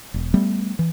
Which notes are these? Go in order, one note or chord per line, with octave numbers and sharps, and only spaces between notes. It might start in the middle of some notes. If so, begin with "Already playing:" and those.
E1
G3 A3 B3
E3